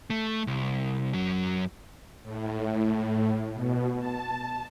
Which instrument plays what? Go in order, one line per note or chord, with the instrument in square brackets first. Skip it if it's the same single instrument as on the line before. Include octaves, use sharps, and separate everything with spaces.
[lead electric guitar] A3
C2
F#2 F#3
[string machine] A2
B2
A5